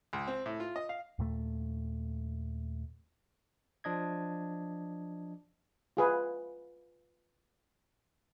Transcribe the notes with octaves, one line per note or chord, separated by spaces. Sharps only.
C#2
C4
A2
F4
D#5
F5
D#2 A#2 A3
F3 D4 D#5 G#6
F4 G#4 B4